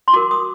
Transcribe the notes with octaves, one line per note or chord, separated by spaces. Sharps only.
C6
F#4 A#4 D6
D#6